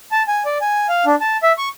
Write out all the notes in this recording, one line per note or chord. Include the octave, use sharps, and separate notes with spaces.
A5
G#5
D5
G#5
F5
D4
A5
E5
C#6